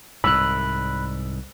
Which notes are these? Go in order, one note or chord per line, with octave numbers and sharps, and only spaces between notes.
C2 G#2 B5 E6 F#6